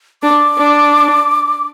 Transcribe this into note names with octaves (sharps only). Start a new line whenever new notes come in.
D4 D6
D4